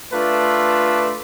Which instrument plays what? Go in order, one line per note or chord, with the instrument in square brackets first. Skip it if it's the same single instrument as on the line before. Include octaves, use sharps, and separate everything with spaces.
[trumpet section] A3 D4 F4 A4 B4 C6